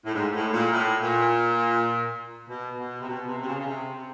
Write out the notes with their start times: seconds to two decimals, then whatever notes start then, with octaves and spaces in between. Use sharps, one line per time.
0.05 A2
0.14 G#2
0.33 A2
0.53 A#2
0.73 A2
1.02 A#2
2.48 B2
2.78 B2
3.01 C3
3.07 B2
3.27 C3
3.41 C3
3.46 C#3
3.59 C#3
3.65 C3
3.95 C3